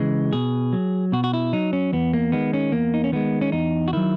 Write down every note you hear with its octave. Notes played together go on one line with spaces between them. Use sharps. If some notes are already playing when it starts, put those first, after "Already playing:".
Already playing: C#3 E3 G#3
B2 G#4
F#3
B2 F#4
F#4
E4
F#3 D#4
C#4
E2 B3
A#3
D#3 G#3 B3
C#4
E2 A#3
D#4
C#4
D#3 G#3 B3
C#4
E2 D#4
F#4
D#3 F#3 E4